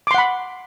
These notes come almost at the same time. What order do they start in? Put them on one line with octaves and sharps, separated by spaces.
D6 C6 F#5 B5